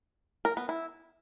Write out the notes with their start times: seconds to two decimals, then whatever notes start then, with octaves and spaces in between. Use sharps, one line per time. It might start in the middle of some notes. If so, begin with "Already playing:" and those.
0.45 A#4
0.57 B3
0.69 E4